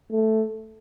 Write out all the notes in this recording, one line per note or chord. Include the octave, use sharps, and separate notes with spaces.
A3